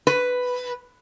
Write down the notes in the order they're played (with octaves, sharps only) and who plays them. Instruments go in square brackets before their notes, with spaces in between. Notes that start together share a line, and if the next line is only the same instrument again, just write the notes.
[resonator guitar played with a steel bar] B4